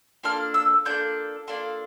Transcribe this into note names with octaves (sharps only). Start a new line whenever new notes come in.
A#3 D4 F4 A4 F6
E6
A#3 D4 F4 A4 G6
A#3 D4 F4 A4